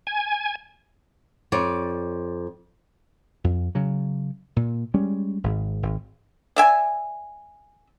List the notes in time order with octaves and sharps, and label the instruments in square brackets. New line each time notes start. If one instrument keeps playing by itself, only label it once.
[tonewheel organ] G#5
[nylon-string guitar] F2 C#5 D5
[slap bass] F2
C#3 F#3
A#2
G3 G#3 C#4
G#1 G#2
G#1
[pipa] D5 E5 G#5